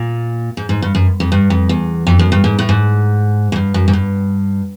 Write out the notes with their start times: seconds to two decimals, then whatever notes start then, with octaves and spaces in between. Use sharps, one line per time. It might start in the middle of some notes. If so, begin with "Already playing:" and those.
Already playing: A#2
0.57 G#2
0.69 G#2
0.82 G2
0.95 F#2
1.20 F2
1.32 G2
1.50 F2
1.69 E2
2.07 F2
2.19 F#2
2.32 G2
2.44 G#2
2.59 A2
2.69 G#2
3.52 G#2
3.56 G2
3.74 F#2
3.88 G#2
3.93 G2